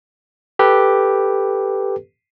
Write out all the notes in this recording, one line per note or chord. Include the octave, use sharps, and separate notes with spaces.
G4 A4 B4